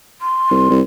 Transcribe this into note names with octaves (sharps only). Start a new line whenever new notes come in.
C6
C2
C2